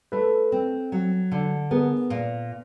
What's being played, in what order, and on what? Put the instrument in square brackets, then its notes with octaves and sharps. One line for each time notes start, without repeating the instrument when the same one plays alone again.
[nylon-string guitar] A3 [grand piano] A4 B4
[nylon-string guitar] C4
F#3
D3
[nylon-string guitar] B3 [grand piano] G#4 A#4
[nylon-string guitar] A#2